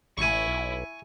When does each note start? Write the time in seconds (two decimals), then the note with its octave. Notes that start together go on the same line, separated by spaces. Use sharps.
0.18 A1 E4 G#5 C#6
0.48 B1